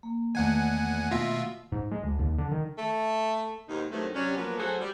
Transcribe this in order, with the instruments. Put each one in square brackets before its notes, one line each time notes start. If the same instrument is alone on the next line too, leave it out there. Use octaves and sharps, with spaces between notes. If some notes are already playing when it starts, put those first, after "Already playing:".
[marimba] A#3
[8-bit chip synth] E2 F#5 G#5 [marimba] D#3 A3
[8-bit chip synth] B2 F4 E5 [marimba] A#6
[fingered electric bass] G#2
G#3
D2
D#2
D3
D#3
[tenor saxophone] A3
[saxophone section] D#2 G#2 B2 B3 D#4
G2 D#3 E3 F#3 A3 C4
C3 F#3 G3 C#4
F3 F#3 A#3 B3 A#4 B4
D2 F#3 F#4 G#4 A4 C5
G3